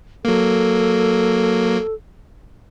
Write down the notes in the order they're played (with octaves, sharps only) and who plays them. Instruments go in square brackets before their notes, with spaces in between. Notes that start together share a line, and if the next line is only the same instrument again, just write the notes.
[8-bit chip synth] F#3 A#3 [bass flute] A4